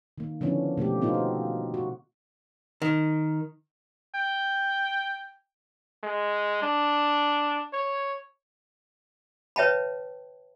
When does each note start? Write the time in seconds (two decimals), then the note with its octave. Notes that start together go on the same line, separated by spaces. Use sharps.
0.18 D#3 A#3
0.41 D3 F3 B3 C#4 D4 E4
0.78 B2 A3 A#3 G4
1.01 B3 C4 D#4 F4
1.14 F#4
1.74 F#4
2.82 D#3
4.15 G5
6.04 G#3
6.63 D4
7.73 C#5
9.56 B4 C#5 E5 G5 A5 B5